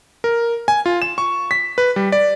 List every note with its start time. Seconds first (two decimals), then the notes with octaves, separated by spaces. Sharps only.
0.24 A#4
0.68 G#5
0.86 F4
1.02 E7
1.18 C#6
1.51 B6
1.78 B4
1.96 G3
2.12 D5